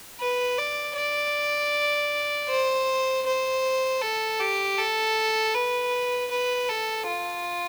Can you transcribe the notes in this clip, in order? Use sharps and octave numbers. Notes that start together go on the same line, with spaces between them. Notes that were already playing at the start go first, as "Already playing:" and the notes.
B4
D5
D5
C5
C5
A4
G4
A4
B4
B4
A4
F4